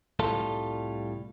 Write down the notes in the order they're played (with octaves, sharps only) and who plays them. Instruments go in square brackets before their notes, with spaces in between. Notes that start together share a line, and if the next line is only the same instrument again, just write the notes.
[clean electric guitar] C2 A2 G3 F4 A4 A5